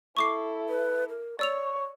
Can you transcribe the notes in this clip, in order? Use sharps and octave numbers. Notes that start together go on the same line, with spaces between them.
E4 A4 C#6 D6 C7
B4
A#4
C#5 D5 C#6 E6 F7